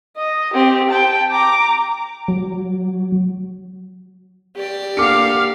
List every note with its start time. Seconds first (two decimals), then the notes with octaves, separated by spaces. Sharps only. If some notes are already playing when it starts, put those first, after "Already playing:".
0.17 D#5
0.54 C4 G4
0.90 G5 A5
1.31 A#5 D6
2.28 F#3
4.57 G4 D5
4.97 A#3 D4 A4 F5 F#5 D6 F6 C#7